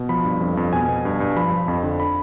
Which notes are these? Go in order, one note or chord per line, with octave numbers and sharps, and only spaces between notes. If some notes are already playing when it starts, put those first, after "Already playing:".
Already playing: B2
F3 B5
G2
F2
F2
B2 G#5
B2
G2
G2
F3 B5
F3
F2
D3
B5